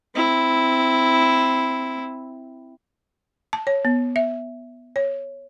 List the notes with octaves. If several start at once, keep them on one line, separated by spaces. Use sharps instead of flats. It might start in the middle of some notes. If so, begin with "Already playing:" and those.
C4 E4
A5
C#5
B3
E5
C#5